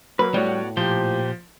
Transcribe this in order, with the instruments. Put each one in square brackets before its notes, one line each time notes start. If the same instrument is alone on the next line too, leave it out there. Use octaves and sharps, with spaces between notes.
[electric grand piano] F#3 [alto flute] A#3 [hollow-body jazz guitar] B4
[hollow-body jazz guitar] A2 [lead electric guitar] G3 [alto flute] B3 [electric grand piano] F#4 C#5 D5
[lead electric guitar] A#2 C5 [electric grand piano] F3 [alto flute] G4